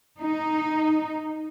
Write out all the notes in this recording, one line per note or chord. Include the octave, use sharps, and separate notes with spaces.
D#4